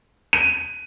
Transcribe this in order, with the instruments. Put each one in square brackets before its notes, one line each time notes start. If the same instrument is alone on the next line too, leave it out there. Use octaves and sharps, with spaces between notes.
[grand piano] D#7